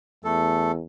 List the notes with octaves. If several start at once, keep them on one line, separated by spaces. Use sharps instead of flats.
E2 A3 A4